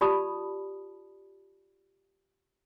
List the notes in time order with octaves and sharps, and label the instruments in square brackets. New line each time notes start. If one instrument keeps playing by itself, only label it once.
[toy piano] F4 G4 D5 A5 B5 D#6